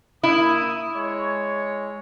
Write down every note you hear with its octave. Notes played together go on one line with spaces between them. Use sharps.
A#3 E4 D#6
G#3 C#5